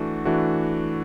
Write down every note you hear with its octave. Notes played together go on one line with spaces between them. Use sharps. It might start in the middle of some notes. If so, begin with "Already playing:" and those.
Already playing: E3 A3 D4 F#4
E3 A3 D4 F#4